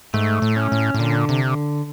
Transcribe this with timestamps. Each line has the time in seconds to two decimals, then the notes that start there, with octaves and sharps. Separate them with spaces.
0.14 G#2 A3
0.42 A2
0.56 C#4
0.72 A2
0.94 A2
0.99 A#2 D3
1.29 C3